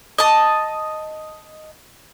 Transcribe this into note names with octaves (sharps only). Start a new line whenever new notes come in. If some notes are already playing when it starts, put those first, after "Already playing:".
D#5 A5